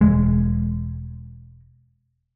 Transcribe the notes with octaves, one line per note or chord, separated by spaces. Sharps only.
E1 G#3